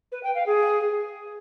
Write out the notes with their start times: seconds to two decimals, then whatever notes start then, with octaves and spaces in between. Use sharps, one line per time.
0.12 B4
0.23 G5
0.35 F5
0.46 G#4